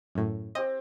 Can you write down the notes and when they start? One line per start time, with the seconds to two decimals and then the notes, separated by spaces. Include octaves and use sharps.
0.15 F#2 A2
0.55 C4 G4 D#5